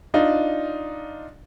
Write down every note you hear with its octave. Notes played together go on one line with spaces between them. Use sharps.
D4 D#4 F4